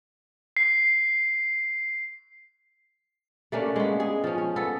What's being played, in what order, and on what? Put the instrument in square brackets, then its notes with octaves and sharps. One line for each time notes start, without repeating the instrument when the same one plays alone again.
[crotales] C7
[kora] A3 A#3 C#4 D4
G#3 B3
G#4
F3 C#4
C#4
B3 A4